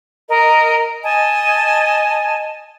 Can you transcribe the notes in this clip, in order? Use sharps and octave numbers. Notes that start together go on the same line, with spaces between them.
A#4 D#5
D#5 G#5 A5